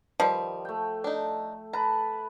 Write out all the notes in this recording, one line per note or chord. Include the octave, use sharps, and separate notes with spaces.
D#3 F3 G3 B4
A3 G5
D4 D#4
B4 A5 A#5